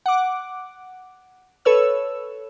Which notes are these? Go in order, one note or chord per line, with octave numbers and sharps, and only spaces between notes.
F#5 D6
A4 B4 C#5 E6